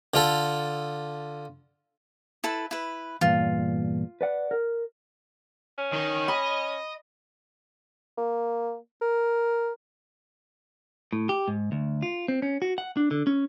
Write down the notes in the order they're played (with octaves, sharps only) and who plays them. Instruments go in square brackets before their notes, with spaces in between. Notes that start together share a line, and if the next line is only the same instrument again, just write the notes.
[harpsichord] D3 F4 A4
[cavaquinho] E4 A4 B4
E4 B4
[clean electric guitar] E2 G2 A#2 [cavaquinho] F4
[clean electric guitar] B4 D5 F#5
A#4
[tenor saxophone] C#4
[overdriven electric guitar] D#3 D#4
[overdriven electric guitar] D#5 [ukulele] B5
[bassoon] A#3
A#4
[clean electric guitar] A2
G4
G#2
D2
F4
C4
C#4
F#4
F#5
D4
D3
C#4